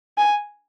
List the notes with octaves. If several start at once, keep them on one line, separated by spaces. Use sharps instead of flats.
G#5